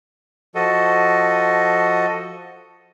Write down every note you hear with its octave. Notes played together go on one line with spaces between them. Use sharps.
F3 F#4 A4 D#5